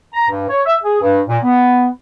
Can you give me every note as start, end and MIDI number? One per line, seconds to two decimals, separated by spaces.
0.14 0.27 82
0.29 0.45 43
0.49 0.61 73
0.66 0.77 76
0.84 1.01 68
1.02 1.22 43
1.29 1.38 46
1.44 1.87 59